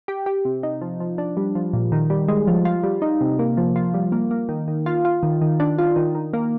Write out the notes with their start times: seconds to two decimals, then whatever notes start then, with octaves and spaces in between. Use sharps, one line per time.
0.08 G4
0.26 G4
0.45 C3
0.63 D#4
0.81 F3
1.00 F3
1.18 D4
1.37 G3
1.55 F3
1.73 A#2
1.92 D#3
2.10 G3
2.28 G#3
2.47 F3
2.65 F4
2.83 G3
3.02 D#4
3.21 C3
3.39 A#3
3.57 F3
3.76 F4
3.94 G3
4.12 A#3
4.31 A#3
4.49 D#3
4.68 D#3
4.86 F4
5.05 F4
5.23 D#3
5.41 D#3
5.60 D4
5.78 F4
5.96 D#3
6.15 D#3
6.33 A#3